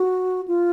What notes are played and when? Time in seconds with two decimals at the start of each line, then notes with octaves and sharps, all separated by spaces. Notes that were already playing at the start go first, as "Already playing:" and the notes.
Already playing: F#4
0.48 F4